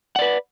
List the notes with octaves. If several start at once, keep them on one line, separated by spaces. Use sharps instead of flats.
B4 D5 F#5